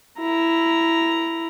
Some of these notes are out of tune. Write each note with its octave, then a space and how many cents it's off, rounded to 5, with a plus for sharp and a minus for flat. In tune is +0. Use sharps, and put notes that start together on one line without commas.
E4 +10 A#5 +0